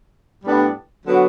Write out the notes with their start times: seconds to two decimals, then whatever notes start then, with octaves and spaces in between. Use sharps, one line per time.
0.44 A2 G3 B3 D4 G4
1.06 D3 F#3 B3 F#4